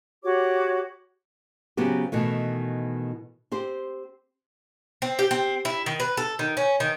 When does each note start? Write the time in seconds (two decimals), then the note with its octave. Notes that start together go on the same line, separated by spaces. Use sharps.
0.24 F#4 G4 C#5 D6
1.77 C#3 F#3 B3 C4 G4
2.12 B2 D#3 E3 A3
3.52 C4 G4 C5
5.02 C4
5.19 G4
5.31 C4
5.65 E4
5.86 D#3
6.00 B4
6.17 A4
6.39 D#3
6.57 C#4
6.80 D#3